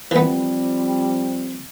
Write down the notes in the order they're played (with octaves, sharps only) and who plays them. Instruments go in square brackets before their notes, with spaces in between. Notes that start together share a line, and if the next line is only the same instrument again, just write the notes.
[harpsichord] E3 B3 [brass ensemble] F3 G3 C4